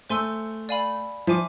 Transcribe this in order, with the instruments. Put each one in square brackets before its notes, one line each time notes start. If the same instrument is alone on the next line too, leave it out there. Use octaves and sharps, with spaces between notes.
[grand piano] A3 [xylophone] C5 G#5 C6 E6
[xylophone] D5 F5 G#5 B5
[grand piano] F3 [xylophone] E5 G#5 D6